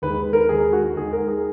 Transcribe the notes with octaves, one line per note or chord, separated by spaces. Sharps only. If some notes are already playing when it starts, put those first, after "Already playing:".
D#2 D#3 G#3 B4
A#4
D#2 D#3 G#3 G#4
F#4
D#2 D#3 G#3 G#4
A#4
G#4